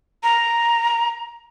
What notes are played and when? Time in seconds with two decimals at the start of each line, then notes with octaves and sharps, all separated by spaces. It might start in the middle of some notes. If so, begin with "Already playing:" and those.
0.23 A#5